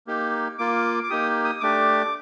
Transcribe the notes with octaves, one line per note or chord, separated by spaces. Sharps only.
A#3 D#4 G4
A#3 F4 D6
D6
A#3 D#4 G4 D#6
D#6
A3 D4 G4 D6